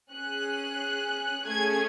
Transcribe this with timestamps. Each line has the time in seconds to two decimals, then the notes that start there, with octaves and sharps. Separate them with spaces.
0.12 C#4 G#4 F#6
1.46 A3 C#4 G#4 G#6